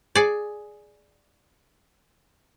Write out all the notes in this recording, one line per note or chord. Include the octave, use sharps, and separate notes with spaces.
G#4 D5